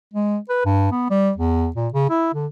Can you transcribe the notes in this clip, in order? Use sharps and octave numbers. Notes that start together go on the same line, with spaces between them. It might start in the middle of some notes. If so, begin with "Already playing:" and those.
G#3
B4
G2
B3
G3
E2
A#2
C#3
E4
D3